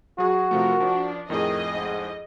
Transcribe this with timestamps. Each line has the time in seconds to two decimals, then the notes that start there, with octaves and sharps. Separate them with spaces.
0.18 F#3 F#4 G#4
0.51 C3 F3 A3 F4 A#4
0.80 F3 D4
1.30 F2 A2 D#3 G#4 D#5
1.74 G#2